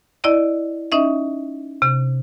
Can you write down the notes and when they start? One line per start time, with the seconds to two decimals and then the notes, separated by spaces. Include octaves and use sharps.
0.24 E4 D5 D#5
0.92 C#4 D#4 D#5 E5
1.82 C3